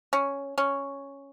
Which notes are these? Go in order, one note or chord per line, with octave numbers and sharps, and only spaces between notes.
C#4
C#4